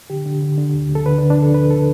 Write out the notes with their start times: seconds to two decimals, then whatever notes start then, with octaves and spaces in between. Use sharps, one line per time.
0.10 D3 G4
0.26 D3
0.42 D3
0.58 D3
0.74 D2
0.90 D2
0.95 A4
1.06 D3 B4
1.18 D4
1.22 D3
1.30 D4
1.38 D3 A4
1.54 D2 B4
1.70 A4